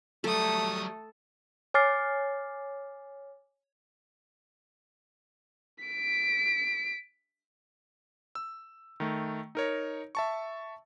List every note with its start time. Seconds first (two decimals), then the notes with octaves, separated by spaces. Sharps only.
0.24 F#3 G3 A3 A4 D#6
1.74 C#5 G#5 D6 F6 A6 C7
5.85 B6 D7
8.35 E6
9.00 D#3 A3
9.55 D#4 A#4 C#5
10.15 E5 A5 C#6